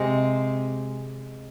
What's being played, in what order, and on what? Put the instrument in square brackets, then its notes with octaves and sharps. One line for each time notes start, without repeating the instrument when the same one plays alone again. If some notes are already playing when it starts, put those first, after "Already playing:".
Already playing: [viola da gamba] C3 [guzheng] G#3